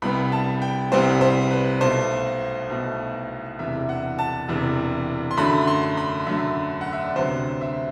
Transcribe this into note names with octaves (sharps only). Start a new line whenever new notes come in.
C2 C3 G3 B3 B5
A5
G5
C2 C3 G3 B3 C5
C5
B4
B1 B2 A3 C5
B1 B2 A3
E1 E2 C3 E5
F#5
A5
E1 E2 C3
C6
F#2 D3 F#3 A3 B5
C6
B5
F#2 D3 F#3 A3 E5
F#5
E5
D5
D2 C3 F#3 B3 C5
E5